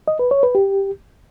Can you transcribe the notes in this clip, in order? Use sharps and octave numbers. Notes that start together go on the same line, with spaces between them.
D#5
B4
C#5
B4
G4